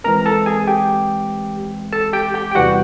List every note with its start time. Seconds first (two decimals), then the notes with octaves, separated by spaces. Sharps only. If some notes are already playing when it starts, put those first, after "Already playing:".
0.04 E3 G#3 C4 A#4 A#5
0.26 A4 A5
0.46 G#4 G#5
0.67 G4 G5
1.93 A4 A5
2.13 G4 G5
2.34 G4 G5
2.51 G5
2.55 E2 C3 E3 G3 F#4 F#5